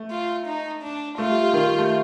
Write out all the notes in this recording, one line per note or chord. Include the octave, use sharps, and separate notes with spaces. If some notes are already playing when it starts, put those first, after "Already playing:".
Already playing: A3
F4
D#4
D4
A3 F4
G3
G3
D#3
G3
A3